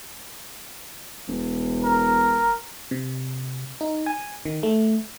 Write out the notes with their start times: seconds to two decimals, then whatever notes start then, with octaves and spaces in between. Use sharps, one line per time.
1.28 E1
1.84 A#4
2.91 C3
3.81 D#4
4.06 G#5
4.45 D#3
4.63 A3